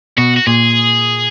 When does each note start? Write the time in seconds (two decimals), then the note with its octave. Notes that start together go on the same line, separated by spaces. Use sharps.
0.18 B2 F#4
0.36 F#4
0.47 A#2 G#4